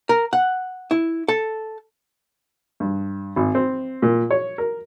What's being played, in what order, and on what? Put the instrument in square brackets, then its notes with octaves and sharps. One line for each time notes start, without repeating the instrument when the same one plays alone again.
[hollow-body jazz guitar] A#4
F#5
E4
A4
[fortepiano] G2
G#1
C4
A#2
C#5
A#4